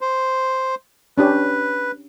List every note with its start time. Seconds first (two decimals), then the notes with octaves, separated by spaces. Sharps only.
0.01 C5
1.18 C#4 D4 G4 B4